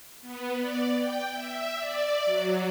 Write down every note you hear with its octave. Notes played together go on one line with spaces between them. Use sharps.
B3
D5
G5
E5
D5
F#3